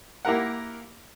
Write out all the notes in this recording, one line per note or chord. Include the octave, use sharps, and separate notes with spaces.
A#3 E4 G4 A#4 F#5